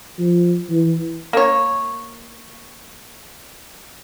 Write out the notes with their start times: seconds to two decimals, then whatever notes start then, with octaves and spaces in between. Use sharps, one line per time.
0.19 F3
0.70 E3
1.33 A#3 C#5